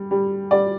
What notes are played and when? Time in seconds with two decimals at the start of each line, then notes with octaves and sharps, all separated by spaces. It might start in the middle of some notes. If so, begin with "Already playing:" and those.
Already playing: G3
0.11 G3
0.51 G3 D5